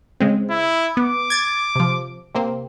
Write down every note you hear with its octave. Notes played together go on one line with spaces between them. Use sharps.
C#3 G#3 C4
E4
B3 D6
G#6 A6
C3 F3
C3 A#3 C4